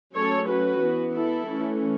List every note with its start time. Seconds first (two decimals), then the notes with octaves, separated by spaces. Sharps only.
0.15 F#3 A3 C#4 A4 C#5
0.49 F#4 B4
0.82 E3 B3
1.15 E4 A4
1.48 E3 A3 C#4